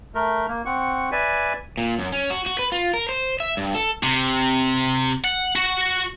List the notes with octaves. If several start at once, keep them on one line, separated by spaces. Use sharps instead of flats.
A3 A#4
A#3
C4 F#5 C#6
B4 D5 E5 G#5
A#2
F#2
C#4
F#4
F#4
B4
F4
A#4
C5
E5
G2
A4
C3
F#5
F#4